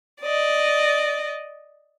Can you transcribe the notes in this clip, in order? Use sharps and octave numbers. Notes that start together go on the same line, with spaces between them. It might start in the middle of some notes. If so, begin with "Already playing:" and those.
D5 D#5